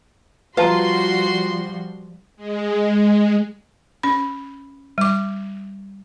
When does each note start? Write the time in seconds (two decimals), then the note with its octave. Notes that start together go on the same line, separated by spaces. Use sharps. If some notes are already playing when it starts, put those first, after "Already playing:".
0.57 F3 G3 F4 F#4 B4 A5 A#5 C6
2.36 G#3
4.03 C#4 B5
4.98 G3 D6